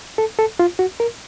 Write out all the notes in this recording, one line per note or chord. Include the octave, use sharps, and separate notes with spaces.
A4
A4
F4
F#4
A#4